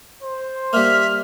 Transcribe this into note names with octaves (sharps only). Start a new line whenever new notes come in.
C5
G3 A#3 E5 F6